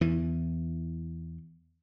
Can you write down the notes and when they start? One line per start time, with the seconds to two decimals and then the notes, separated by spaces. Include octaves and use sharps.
0.01 E2 E3